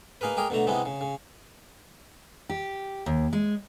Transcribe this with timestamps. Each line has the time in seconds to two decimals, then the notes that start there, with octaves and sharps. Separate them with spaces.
0.21 A#3 D#4 G#4 A#4 B4
0.37 G#3 G4 G#4 A#4
0.50 B2 D3 A3 A#5
0.67 C3 G#3 B3 D#4 E4
0.86 C#3
1.01 C#3
2.50 G4
3.06 D#2
3.33 G#3